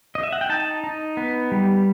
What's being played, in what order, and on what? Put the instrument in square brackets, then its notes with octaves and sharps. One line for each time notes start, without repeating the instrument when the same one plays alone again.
[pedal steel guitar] D#5
E5
F#5
G5
D#4 A5
D#4
B3
G3